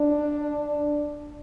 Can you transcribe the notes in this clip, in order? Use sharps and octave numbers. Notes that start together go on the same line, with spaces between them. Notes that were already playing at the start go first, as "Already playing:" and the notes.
Already playing: D4